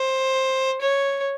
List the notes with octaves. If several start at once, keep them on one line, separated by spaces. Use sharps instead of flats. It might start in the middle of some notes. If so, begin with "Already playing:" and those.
Already playing: C5
C#5